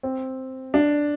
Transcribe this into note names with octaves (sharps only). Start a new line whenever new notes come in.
C4
D4